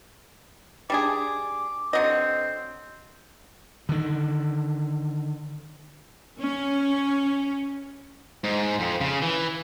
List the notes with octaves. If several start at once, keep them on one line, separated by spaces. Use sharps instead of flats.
G3 D4 G#4 D6
D3 F#3 C4 D#5
D3 D#3
C#4
G#2
F2
C#3
E3